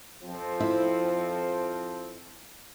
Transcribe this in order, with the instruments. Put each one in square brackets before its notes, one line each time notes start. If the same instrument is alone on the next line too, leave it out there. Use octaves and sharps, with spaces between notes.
[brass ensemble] F2 F3 C4
[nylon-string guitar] E4